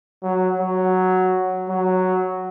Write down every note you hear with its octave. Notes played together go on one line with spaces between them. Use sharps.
F#3
F#3
F#3